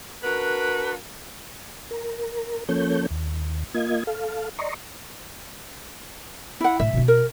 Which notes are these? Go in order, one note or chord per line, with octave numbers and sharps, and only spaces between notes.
D4 F#4 A#4 B4
A#4
F3 A#3 C#4 A4 C#5 G6
D#2
A#3 F4 D#5 G#6
A4 F5
D5 D#5 A#5 C6 C#6
E4 F#5
A2 E5
B2 C4
A#4